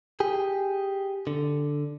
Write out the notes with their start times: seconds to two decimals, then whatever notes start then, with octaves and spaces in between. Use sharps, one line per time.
0.20 G4 G#4
1.27 D3